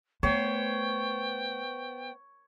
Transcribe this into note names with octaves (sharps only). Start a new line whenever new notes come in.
A3 B3 C5 C#5 G5